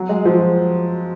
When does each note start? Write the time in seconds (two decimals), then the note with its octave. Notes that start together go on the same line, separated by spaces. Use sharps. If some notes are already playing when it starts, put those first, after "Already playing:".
Already playing: F#3
0.09 G#3
0.25 F3